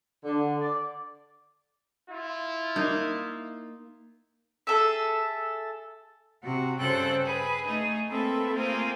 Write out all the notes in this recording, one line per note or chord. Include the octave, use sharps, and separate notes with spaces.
D3
D5
E4 F4
A#3 D#4
G#4 A4 E5
C3 F#4
G2 C#3 A4 C5 G5 F#6
G#4 B4
A3 D#4 G#4
A#3 C4 A4 B4 E5
A3 A#3 C4 F4 G#4